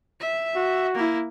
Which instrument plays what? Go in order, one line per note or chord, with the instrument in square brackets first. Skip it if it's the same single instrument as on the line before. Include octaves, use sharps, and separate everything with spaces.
[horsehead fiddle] E5
[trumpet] F#4
[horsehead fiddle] A#3 E4